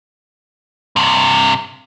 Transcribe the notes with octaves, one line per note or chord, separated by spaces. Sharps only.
G2 C3